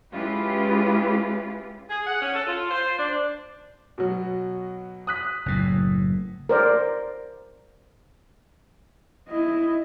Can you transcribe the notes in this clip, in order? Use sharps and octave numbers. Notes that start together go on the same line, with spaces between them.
G#3 C#4 E4 F4 G4 B4
G#4
F#5
C#4
A4
F4
C5
D4
B2 F#3
D#6 F#6 B6
F#1 A2
A#4 C5 D5
E4 D#5